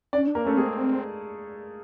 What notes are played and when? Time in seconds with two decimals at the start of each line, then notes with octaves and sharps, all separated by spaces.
0.13 C#4 D4 D5
0.27 D4
0.35 A#3 A#4
0.42 A3 C#4 A4
0.57 G#3 C4 G#4